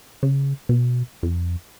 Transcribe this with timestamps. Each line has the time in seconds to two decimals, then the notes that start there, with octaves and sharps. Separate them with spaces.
0.23 C#3
0.69 B2
1.23 F2